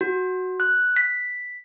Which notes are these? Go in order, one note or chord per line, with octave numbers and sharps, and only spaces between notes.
F#4
F#6
B6